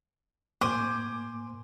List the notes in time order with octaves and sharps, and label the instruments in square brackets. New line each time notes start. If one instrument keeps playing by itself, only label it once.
[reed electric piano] A2 A#3 [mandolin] C5 G#5 [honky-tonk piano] D6